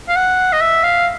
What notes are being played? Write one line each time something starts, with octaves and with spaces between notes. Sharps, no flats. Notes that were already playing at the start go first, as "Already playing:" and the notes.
F5
F#5
D#5
E5
F5